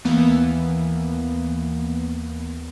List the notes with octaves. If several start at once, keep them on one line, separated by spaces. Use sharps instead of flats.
D#2 E3 A#3 B3